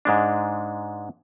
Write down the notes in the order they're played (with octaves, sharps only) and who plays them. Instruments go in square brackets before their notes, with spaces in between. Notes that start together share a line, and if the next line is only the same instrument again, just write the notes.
[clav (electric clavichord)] G#2 G#3 D4